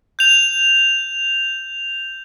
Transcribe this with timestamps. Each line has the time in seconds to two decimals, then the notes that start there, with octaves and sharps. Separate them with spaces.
0.19 G6 F7